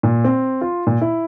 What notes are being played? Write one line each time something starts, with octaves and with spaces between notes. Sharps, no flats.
A#2
C4
F4
A#2
E4